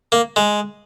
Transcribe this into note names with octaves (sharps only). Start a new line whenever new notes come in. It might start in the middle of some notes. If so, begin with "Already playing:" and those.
A#3
G#3